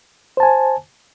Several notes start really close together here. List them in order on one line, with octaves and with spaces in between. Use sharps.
C5 A5 G#5